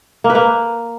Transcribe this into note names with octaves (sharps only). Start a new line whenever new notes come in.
A#3
B4
A#3